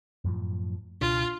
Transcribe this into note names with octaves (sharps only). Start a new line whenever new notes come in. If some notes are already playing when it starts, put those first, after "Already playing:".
F#2 A2 F3
C#2 B2 D4 F4